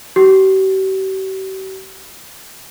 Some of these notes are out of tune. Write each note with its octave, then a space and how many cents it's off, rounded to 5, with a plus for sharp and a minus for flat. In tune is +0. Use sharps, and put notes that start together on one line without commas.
G4 -45